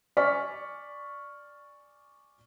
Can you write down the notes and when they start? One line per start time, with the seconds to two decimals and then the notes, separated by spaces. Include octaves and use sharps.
0.17 D5 G#5 C#6 F6 B6